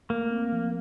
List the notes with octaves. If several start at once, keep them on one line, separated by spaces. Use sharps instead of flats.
A3 A#3
C4
F3